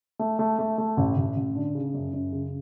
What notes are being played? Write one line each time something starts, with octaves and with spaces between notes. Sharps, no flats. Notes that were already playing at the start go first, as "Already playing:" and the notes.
A3
A3
A3
A3
A1
A1
A1
D3
C#3
F#2
F#2
C#3